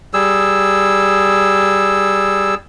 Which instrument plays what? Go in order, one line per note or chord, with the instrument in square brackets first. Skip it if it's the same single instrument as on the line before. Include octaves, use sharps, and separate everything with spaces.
[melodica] G3 G#4 E6